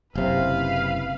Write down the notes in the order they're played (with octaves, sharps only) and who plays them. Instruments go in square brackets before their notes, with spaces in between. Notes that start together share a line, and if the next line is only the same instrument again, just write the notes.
[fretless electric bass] F#1 C3 [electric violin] B4 F5